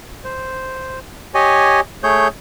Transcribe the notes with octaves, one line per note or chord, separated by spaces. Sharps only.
C5
G4 C#5 D#5 G#5
A3 G#4 C#5 G6